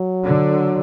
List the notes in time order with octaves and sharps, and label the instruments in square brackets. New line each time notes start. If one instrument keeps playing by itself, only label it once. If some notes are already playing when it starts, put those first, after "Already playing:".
Already playing: [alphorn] F#3
[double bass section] D3